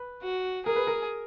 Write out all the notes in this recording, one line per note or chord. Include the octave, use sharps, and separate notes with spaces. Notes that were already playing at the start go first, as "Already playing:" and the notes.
Already playing: B4
F#4
G#4 A#4
B4
A#4